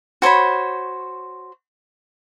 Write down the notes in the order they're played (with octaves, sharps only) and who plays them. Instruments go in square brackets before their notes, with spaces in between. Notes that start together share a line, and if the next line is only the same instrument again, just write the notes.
[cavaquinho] F#4 C5 C#5 B5